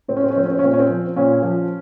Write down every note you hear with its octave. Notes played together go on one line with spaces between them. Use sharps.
A2 C4
C#4
C4
C#4
F3 C4
C#4
C4
C#4
A#2 C4
C#4
C4
F3
A#2 C#4
F3